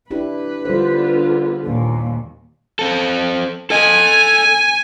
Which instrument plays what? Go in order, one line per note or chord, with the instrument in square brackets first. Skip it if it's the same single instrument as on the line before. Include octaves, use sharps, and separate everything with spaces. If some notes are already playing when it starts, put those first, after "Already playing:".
[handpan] D4 E4 G4 [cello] B4
[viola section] D3 B3 F4 [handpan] G3 C5
[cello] D#2 A#2
[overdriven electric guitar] C4 A4
[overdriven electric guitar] A4 D#5 [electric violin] G#5